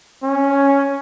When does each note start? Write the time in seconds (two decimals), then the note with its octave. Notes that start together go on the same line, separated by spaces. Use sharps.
0.23 C#4